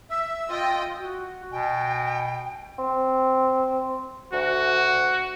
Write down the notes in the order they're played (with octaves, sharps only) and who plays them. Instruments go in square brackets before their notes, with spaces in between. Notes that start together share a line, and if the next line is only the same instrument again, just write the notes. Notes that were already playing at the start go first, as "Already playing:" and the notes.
[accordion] E5 [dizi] E6
[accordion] F4 [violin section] D#5 G5
[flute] F#4
[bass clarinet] B2 [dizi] G5 [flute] G#5
[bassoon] C4
[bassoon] D2 [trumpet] F#4